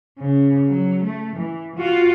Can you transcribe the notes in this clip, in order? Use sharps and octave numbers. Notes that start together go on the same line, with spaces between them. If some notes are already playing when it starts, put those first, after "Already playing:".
C#3
F#3
A3
E3
F4 F#4